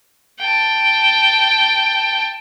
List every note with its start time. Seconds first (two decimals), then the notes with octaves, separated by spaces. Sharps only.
0.40 G5 A5